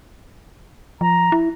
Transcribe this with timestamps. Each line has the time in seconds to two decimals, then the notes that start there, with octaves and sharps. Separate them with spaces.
1.01 F3 A#5
1.32 E4